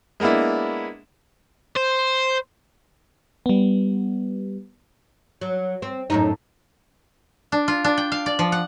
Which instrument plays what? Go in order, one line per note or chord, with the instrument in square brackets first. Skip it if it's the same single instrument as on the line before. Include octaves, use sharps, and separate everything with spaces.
[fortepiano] G#3 A#3 B3 D4 E4
[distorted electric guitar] C5
[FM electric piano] G3 B3
[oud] F#3
C4
F#2 A2 D#4
[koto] D4
F4
D4
G5
F5
D5
F3
F#5